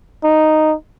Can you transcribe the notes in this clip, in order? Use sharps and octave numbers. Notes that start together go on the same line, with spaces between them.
D#4